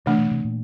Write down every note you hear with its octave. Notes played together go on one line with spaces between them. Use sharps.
C3 E3 A3 D4
B2
C3
A#2